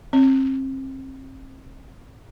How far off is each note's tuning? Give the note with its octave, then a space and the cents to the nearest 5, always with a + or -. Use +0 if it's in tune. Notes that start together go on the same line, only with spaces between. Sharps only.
C4 +35